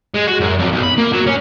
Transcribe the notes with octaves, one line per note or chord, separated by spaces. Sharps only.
G#3
F#4
F#2
F2
B1
B5
A#3
F#3
C#4